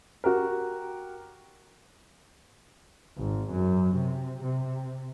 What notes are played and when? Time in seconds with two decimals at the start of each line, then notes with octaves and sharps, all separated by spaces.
0.24 F#4 G4 A#4
3.17 G#1
3.51 F#2
3.96 C3
4.43 C3